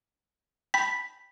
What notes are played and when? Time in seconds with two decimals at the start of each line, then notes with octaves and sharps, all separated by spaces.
0.74 G5 A5 B5 B6